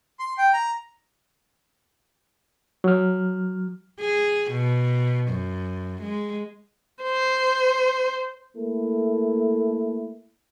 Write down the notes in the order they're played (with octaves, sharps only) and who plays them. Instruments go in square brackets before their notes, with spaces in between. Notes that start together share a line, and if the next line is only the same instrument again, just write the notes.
[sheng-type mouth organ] C6
G5
A#5
[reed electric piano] F#3 F6
[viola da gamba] G#4
B2
F#2
G#3
[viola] C5
[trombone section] A3 A#3 E4 A4